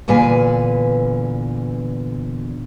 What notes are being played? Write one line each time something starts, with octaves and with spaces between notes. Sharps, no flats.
E2 A#2 D3 B4 G#5